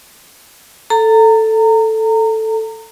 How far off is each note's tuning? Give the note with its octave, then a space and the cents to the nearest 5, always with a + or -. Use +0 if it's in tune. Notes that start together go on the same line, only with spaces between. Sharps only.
A4 +0 A#5 -25